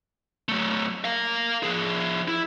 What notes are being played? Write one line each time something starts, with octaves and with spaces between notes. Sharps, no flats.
F#3 A3
A#4 F5
F3 G#4
E4